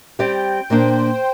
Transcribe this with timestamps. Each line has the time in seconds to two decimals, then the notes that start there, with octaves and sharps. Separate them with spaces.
0.19 G3 C4 G4 D5 G5
0.70 A#2 A#3 D4 C5